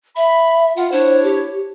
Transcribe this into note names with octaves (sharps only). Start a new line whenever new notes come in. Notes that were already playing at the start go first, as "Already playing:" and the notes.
E5 B5
F4 F#5
D4 E4 C5 C#5
G4